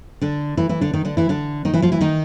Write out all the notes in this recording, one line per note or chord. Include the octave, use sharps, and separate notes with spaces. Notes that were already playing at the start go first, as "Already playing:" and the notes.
D3 D4
E3 E4
E3 E4
D3 D4
D#3 D#4
D3 D4
E3 E4
D3 D4
D#3 D#4
E3 E4
F3 F4
E3 E4
D#3 D#4